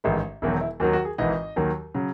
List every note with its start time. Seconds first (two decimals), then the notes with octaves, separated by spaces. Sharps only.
0.04 A1 G#2 D#3 G#3 E4
0.42 E1 E2 D#3 F#3 E4
0.61 E4
0.80 D#2 D#3 F#3 F#4
0.93 F#4
1.05 G#4
1.18 G#1 G#2 E3 D#5
1.56 D#2 D#3 F#3
1.94 C#3 F#3